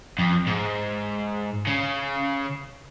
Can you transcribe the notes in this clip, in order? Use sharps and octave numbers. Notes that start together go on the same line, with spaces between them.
F2
G#2
C#3